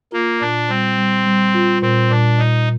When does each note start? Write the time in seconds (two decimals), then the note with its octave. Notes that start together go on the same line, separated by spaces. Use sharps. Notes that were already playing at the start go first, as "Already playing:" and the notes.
0.12 A#3 F4
0.41 A#2 D4
0.69 G3 C4
0.98 G3
1.26 G3
1.54 F4
1.82 A#2 C4
2.11 A#2 D4
2.38 A#2 D#4